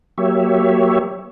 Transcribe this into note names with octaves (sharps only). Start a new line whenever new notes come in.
F#3 A#3 G4 C#5 E5